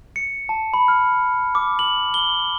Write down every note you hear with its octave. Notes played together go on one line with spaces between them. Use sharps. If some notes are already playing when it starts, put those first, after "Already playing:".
C#7
A5
B5
F6
D6
F#7
G7